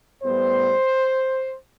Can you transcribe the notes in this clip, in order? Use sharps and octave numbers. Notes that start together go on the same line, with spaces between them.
A2 G3 B3 C5